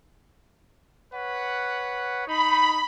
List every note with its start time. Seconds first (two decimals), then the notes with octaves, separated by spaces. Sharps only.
1.13 B4 C#5 F#5
2.28 D#4 B5